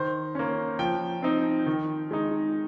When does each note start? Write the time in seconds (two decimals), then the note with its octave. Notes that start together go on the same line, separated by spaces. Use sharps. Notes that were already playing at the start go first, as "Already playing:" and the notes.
Already playing: D#3 C5
0.35 A#3 C#4
0.79 F3 G5
1.22 C4 D#4
1.66 D#3
2.11 G#3 D#4